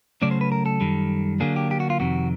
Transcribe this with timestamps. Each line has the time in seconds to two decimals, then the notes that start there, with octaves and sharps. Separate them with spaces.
0.22 C#3 F#3 A3 C#4 D5
0.31 C5
0.41 B4
0.52 A#4
0.66 A4
0.81 F#2 D#3 G3
1.40 D3 F#3 A#3 D4 G#4
1.56 G4
1.71 G4
1.80 F#4
1.90 F4
2.00 F2 C3 D#3 F#4